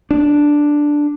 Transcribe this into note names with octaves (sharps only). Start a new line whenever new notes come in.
D4